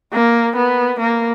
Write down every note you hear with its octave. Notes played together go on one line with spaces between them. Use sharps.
A#3
B3
A#3